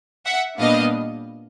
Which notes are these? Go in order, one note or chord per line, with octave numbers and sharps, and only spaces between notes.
E5 F#5
A#2 G3 B3 D4 D#5 F5